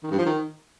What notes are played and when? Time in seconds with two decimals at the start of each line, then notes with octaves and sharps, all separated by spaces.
0.03 D#3
0.11 G2
0.18 F3
0.26 D#3